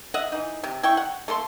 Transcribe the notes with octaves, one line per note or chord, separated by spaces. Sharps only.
D#5 E5 F#5
E3 D#4
C3
E4 G5 C#6
F#5
A3 A#3 A4 C6